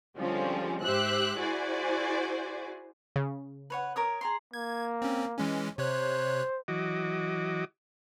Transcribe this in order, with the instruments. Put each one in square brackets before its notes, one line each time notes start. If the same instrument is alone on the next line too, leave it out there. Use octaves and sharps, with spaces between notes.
[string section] D3 F3 G3 G#3 C4 C#4
G#2 G4 C5 E5 E6 F#6
E4 F#4 G#4 C5 D5 G#5
[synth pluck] C#3
[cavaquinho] B4 C#5 F#5
A#4 C#5 D#6
G#4 A#5 C6
[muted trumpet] A#3 [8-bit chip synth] G#6
[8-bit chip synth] C4 C#4
E3 G#3 C#4
[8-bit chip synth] C3 C#5 F#6 [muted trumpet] C5
[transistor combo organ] E3 F#3 F#4 D#5 D6